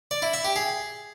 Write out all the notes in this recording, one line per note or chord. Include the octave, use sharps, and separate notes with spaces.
D5
E4
E5
G4
G#4